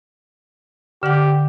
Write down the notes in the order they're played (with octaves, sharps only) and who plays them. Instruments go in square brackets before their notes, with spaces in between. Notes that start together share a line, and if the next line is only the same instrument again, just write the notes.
[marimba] D3 F#5 [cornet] G4